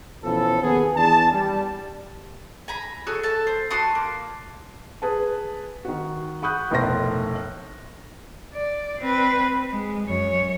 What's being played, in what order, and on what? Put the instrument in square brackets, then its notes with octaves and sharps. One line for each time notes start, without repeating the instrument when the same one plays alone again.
[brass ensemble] B2 E3 F3 C#4 A4
D#2 B3 G#4
E2 D4 G#4 A5
G3
[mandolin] G#5 A#5 B5
F#4 G#4 A4 C#5
A4 A5
C5
F#4 A5 C6 D#6
A#3
[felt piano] G#4 B4 A5
D#3 F#4
F#5 B5 C#6 D#6 F#6 G6
F1 B1 A2 A#4 C6 A#6
[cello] D5
C4 B4
G#3
F#2 C#5